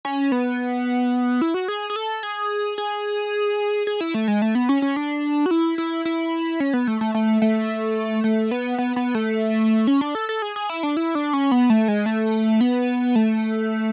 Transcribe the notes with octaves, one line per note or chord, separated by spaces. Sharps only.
C#4
B3
E4
F#4
G#4
G#4
A4
G#4
G#4
G#4
E4
A3
G#3
A3
B3
C#4
C#4
D4
F#4
E4
E4
E4
C#4
B3
A3
A3
A3
A3
A3
B3
B3
B3
A3
C#4
D4
A4
A4
G#4
G#4
E4
D4
E4
D4
C#4
B3
A3
G#3
A3
B3
A3